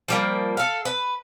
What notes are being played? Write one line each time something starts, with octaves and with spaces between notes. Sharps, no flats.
F3 G3 A#3
A4 F5
B4